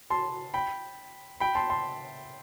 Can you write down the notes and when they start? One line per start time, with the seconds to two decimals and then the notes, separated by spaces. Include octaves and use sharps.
0.10 A5 C6
0.54 G5 B5
1.40 G5 B5
1.55 A5 C6
1.70 A5 C6